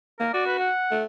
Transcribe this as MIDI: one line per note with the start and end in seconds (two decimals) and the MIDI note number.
0.20 0.33 58
0.20 0.33 70
0.33 0.68 66
0.33 0.44 74
0.46 0.55 71
0.59 1.00 78
0.91 1.04 57